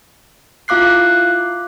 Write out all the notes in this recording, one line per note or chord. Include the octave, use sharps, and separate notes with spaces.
E4 F4 F5 D6 F#6 C7